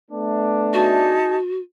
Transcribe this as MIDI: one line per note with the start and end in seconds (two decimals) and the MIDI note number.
0.11 1.19 57
0.11 1.19 59
0.11 1.19 62
0.73 1.35 63
0.73 1.59 66
0.73 1.35 68
0.73 1.35 81